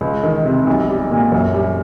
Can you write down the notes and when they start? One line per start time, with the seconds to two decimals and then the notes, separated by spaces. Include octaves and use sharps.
0.01 C#2
0.23 D#3
0.45 C3
0.67 B1
0.89 G3
1.11 A#2
1.32 F#2
1.54 G3